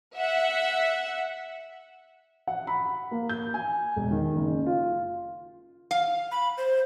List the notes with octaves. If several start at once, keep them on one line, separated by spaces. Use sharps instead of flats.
E5 F#5
F#5
B5
A#3
G6
G#5
E1
D#3
F#1
F4
F5
B5
C5